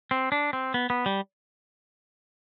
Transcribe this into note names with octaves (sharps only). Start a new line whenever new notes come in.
C4
D4
C4
B3
B3
G3